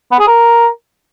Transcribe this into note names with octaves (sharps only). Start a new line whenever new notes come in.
B3
G#4
A#4